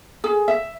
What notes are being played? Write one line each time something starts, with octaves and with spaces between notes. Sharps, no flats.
G#4
E5